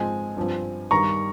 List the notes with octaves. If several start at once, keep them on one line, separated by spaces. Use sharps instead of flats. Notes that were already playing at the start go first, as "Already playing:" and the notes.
Already playing: G#2 F3 G#3 C4 G#5
G2 F3 C4
G2 D#3 G3 A#5 C#6